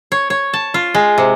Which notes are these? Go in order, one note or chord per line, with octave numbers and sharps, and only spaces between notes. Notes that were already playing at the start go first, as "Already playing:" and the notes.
C#5
C#5
A5
F4
G#3
C3